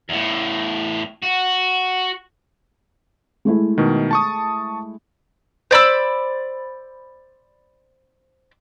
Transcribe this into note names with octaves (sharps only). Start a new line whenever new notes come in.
E2 A2
F#4
G#3 A3 E4
B2 D#3
A5 C#6 D#6
C5 D5 B5 E6